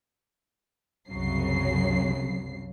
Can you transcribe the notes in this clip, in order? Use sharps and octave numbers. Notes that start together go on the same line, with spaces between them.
C2 F#2 C#3 F#3 C7